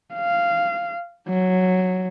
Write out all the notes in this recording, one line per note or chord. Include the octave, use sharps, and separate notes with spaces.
F5
F#3